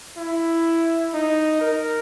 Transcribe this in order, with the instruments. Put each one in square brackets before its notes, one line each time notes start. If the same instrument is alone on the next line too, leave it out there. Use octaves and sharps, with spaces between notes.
[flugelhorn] E4
D#4
A#4